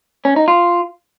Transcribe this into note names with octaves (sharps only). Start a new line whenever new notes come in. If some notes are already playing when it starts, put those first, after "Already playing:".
C#4
D#4
F4